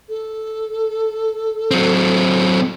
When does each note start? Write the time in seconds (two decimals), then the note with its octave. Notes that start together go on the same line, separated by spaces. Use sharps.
0.09 A4
1.71 F#3 C4